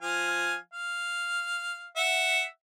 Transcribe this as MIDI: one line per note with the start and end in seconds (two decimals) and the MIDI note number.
0.02 0.55 53
0.02 0.55 77
0.02 0.55 80
0.73 1.89 77
1.96 2.42 76
1.96 2.42 78